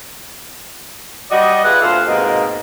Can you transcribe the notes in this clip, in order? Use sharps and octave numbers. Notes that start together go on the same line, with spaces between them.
G3 F#4 D5 D#5
F4 G#4 B4 D5 E5 F#5
D2 C3 F4 A4 C5
G#2 B2 A#3 C4 D#5